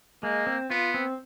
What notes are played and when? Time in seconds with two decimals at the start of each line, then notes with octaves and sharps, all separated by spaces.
0.23 G#3 A#3
0.47 C4
0.70 B3 F4
0.94 C4